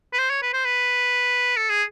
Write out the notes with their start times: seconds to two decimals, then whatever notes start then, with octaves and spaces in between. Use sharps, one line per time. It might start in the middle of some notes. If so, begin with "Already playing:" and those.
0.13 B4
0.19 C5
0.30 C#5
0.42 B4
0.53 C5
0.65 B4
1.57 A4
1.70 G#4